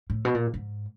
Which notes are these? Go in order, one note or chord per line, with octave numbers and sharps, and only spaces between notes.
A2
B2
A#2
G#2